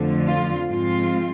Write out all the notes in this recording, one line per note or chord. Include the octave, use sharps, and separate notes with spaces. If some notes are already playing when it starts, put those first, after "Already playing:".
Already playing: F2 D3 F3 A3
F4
G#2 F3 G#3 C4 F4